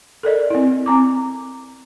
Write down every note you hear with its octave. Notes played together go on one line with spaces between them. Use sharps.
A4 A#4 D5 D#5
C4 E4
C4 A#5 D6